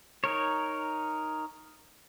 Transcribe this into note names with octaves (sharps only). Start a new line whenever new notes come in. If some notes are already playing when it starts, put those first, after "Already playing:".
D#4 A#4 C#5